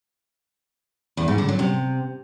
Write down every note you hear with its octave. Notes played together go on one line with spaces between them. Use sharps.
E2
G#2
D3
F#3
C3